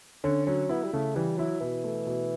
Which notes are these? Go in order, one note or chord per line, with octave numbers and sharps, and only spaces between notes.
D3 C#4
F#3 C#4
B3 E4
G3
C#3 A3
E3 G3
F#3 E4
B2 E3
A3
B2